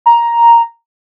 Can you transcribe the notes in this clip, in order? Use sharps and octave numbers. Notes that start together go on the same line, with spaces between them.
A#5